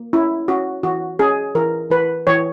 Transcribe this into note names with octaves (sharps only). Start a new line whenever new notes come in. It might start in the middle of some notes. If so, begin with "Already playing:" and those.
Already playing: A#3
C#4 E4
C#4 F#4
E3 F#4
C#4 G#4
E3 A#4
E3 B4
E3 C#5